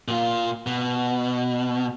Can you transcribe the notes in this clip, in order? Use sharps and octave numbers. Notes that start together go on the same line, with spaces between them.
A#2 F4
B2